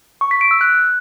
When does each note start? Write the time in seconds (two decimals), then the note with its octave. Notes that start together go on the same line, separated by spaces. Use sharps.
0.21 C#6
0.31 B6
0.41 D7
0.51 E6
0.61 F#6